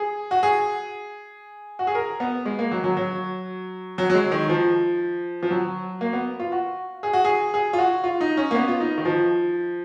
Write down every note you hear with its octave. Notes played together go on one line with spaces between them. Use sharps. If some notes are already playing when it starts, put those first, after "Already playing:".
Already playing: G#4
F#4
G#4
F#4
G#4
A#4
B3
G#3
A#3
F#3
F#3
F#3
F#3
F#3
G#3
D#3
F3
F3
F#3
A#3
B3
F4
F#4
G#4
F#4
G#4
G#4
F4
F#4
F4
D#4
C#4
A#3
B3
F4
D#4
D#3
F3